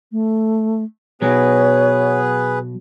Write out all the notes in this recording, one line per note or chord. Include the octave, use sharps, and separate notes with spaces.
A3
B2 F#3 B3 G#4 B4 C#5